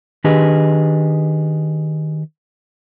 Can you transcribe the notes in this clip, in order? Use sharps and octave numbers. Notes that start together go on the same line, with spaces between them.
D#3 D4 G4 G#4 B4 D#5